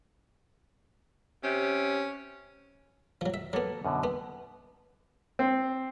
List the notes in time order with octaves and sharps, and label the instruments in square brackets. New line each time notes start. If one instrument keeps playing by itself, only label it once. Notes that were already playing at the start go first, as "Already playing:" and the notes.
[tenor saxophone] C3 [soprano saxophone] C#4
[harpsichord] F3 F#3
E5
[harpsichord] F#3 B3 [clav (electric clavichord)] A#3 A4
[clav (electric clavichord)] F#2 B2 D3
[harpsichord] B3
[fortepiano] C4